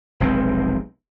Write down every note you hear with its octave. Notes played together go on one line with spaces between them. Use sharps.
F1 B1 G#3 C4